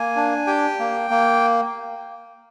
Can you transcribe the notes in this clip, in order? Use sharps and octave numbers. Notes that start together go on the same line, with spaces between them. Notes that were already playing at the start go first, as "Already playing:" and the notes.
Already playing: A#3 G#5
D4
G4 G5
A#3
A#3